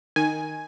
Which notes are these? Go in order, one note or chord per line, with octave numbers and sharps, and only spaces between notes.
D#3 G#5